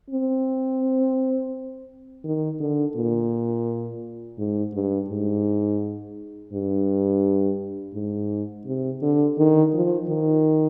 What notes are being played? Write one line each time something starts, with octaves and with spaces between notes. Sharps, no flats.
C4
D#3
D3
A#2
G#2
G2
G#2
G2
G#2
C3
D3
D#3
F3
D#3